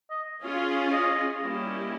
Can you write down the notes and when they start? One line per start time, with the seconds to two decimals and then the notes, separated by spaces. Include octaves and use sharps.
0.10 D#5
0.43 C#4 F4 G#4
0.93 D#5
1.42 G3 A#3 C#4 E4 G4